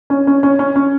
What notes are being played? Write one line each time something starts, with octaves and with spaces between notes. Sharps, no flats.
C#4
C#4
C#4
C#4
C#4